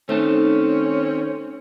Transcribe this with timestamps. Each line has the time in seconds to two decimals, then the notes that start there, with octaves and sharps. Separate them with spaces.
0.09 D#3 A3 C4 C#4 D#4 A5